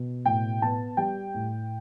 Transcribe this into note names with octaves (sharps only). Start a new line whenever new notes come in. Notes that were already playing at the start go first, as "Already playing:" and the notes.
Already playing: B2
A2 G5
B3 A5
G3 G5
A2